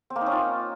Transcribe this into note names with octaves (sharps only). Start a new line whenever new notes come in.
C4
A#3
D#4
C#4
F4